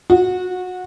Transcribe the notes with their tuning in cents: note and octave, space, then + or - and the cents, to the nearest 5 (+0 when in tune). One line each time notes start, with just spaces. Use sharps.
F#4 -20